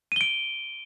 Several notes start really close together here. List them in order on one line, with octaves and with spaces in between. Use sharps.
D#7 G7 D7